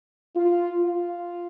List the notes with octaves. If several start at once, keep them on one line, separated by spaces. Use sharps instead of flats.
F4
F4